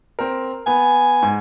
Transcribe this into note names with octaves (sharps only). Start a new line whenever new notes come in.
C4 A#4
B3 G#5
G#2